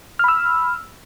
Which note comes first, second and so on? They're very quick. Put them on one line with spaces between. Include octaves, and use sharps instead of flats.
F6 B5 E6